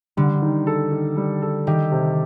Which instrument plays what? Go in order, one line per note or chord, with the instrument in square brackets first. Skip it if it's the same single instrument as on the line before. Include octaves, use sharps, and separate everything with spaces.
[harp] D3 [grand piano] G3
[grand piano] D#3
A4
D#3
G3
A4
[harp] D#3 [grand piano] G4
[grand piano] C3